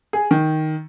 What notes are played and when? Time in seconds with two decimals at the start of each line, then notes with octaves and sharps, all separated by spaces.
0.13 G#4
0.31 D#3